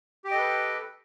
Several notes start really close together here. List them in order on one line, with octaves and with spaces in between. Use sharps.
G4 G5 D#5 A4 B4